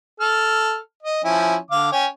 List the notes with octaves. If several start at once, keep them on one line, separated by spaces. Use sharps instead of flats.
A4 F6
D#5
F3 C#4 E4
D3 F5 D6
C#4 C#5 G5